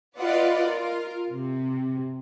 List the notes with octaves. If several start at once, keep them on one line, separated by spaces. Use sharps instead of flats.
F4 B4 D5 D#5 F5 F#5
F4 A#4
C3